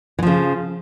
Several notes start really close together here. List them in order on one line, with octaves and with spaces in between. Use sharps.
E3 F3 C#3